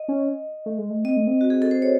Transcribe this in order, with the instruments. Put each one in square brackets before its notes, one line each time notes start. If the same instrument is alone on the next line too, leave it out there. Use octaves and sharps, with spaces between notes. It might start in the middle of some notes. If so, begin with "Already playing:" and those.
Already playing: [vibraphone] D#5
[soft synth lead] C#4
A3
G#3
A3
[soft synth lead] C4 [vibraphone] D#5
[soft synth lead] A3
C4
[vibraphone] F#4
G#4
A4
C5
C#5